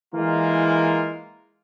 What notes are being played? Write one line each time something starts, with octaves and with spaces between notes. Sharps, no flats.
E3 G#3 A#3 F4 A#4